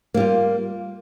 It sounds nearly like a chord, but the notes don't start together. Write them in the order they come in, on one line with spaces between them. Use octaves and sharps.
A#3 G3 F4